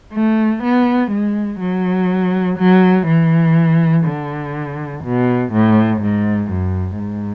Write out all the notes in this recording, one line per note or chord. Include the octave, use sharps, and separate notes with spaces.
A3
B3
G#3
F#3
F#3
E3
D3
B2
A2
G#2
F#2
G#2